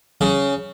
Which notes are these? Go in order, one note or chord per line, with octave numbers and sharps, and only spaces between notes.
C#3